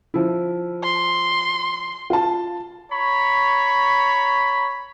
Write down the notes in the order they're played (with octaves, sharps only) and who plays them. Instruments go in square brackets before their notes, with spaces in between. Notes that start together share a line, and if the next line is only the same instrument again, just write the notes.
[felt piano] F3 E4
[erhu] C6
[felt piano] F4 A5
[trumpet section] C#5 A#5 B5 C#6